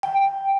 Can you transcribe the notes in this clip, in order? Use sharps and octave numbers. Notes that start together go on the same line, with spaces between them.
G5